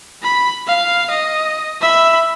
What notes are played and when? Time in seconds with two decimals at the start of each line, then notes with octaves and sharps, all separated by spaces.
0.23 B5
0.67 F5
1.10 D#5
1.82 E5 B5